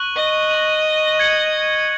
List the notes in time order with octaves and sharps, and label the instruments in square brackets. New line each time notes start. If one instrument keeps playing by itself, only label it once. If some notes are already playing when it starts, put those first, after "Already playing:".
Already playing: [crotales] C#6 F#6 D#7 F#7
[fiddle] D#5
[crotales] C#6 A#6 F#7
G#6 C#7 F#7